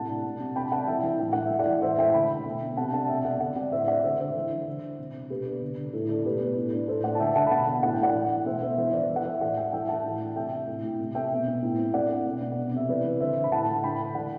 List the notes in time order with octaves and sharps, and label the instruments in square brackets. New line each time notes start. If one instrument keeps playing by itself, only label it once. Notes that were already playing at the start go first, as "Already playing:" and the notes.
Already playing: [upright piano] A2 C3 F#5 A5
D4
C3
C3
C3 G5 B5
D4 F#5 A5
E3 E5 G5
E3
A2 G5
A2 F#5
E3 E5
D5 F#5
E3
A2 C5 E5
A2 E5 G5
D3 G5 B5
D3
B2
D4
C3 F#5 A5
D4 F#5 A5
B2 E5 G5
C4 D5 F#5
D3 D5 F#5
C4 D5 F#5
A2 C5 E5
D4 D5 F#5
D3 C5 E5
D3 C5 E5
E3
D4
D3
D4
C3
C3
B2 G4 B4
D4
D3
D3
A2 A4
D4 A4
B2 G4 B4
B2
A2
D4
A2 A4 C5
A2 D5 F#5
A5
D3 E5 G5
D3 F#5 A5
B5
B2 F#5 A5
D4
A2 F#5
G5
A2 D5 F#5
E3
D4
B2 C5 E5
B2 C5 E5
E3 C5 E5
E3 B4 D5
E3
F#5
E3 C5 E5
A2 D5 F#5
A2 E5 G5
E3 E5 G5
E3 F#5 A5
A2
D4
C3 E5 G5
C4
A2
A2
C3
B3 E5 G5
B2
B2
A2
C4
A2 D5 F#5
D4
B2
B2
C3
C3 E5
E3 B4 D5
E3
D3 C5 E5
D3
B5
A2 F#5 A5
A2
D3 G5 B5
D3
E3 D5 F#5